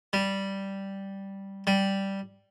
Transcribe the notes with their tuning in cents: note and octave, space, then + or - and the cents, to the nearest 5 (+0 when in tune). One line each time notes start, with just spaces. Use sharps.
G3 -5
G3 -5